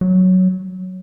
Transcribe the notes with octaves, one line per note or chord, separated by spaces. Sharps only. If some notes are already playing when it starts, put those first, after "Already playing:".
F#3